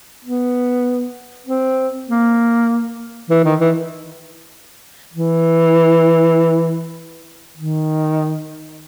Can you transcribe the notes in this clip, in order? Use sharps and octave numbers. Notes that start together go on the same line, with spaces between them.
B3
C4
A#3
E3
D#3
E3
E3
D#3